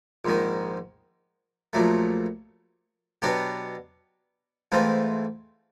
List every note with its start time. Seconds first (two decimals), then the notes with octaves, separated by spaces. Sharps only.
0.25 A#1 G#2 D#3
1.73 A#1 A#2 F#3 A3
3.22 B2 F#3 B3 D4 G4
4.72 G#2 E3 A3 C4 F4